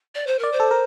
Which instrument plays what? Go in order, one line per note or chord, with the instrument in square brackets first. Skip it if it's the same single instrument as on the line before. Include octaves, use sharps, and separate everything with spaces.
[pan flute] D5
C5
[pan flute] A#4 [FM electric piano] D5
[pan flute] C5
[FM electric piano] A4
A#4